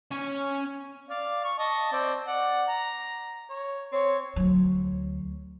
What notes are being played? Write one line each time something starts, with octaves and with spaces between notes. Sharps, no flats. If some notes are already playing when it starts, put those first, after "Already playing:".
C#4 G#5
D5 F5
C#6
D#5 A5 C#6
C4 D5
D5 F#5
A#5
C#5
C4 C#5
D2 F#3